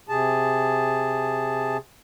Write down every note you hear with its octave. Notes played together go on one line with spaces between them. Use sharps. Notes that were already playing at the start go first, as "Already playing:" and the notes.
C3 G#4 A5